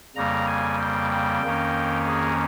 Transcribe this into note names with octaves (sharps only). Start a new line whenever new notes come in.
F2 C#3 G3 A#3 A#5
G#5
G5
G5
F2 D#3 A#3 C#4
G#4